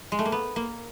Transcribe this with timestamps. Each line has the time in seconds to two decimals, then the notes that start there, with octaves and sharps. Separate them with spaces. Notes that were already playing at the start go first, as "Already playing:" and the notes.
0.12 G#3
0.19 A3
0.25 A#3
0.32 B3
0.56 A#3